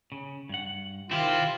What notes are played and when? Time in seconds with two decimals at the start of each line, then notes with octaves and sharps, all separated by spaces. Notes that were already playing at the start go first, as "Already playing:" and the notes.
0.12 C#3
0.49 G2 F#5
1.11 D#3 C4 E4 F4 G4